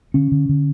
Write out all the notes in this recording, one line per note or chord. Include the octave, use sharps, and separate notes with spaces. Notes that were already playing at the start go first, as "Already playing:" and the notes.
D3 C#4
D3
D3